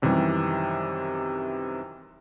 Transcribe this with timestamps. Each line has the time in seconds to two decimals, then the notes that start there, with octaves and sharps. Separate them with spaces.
0.02 F#2 C3 D#3 E3 G3